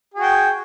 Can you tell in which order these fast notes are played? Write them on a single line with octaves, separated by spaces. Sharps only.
G#4 F#4 G5